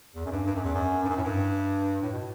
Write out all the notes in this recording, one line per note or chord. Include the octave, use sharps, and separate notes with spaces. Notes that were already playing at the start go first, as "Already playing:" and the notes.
E2
F#2
G2
G2
F#2
E2
F#2
G2
F#2
A2
G2
A2
B2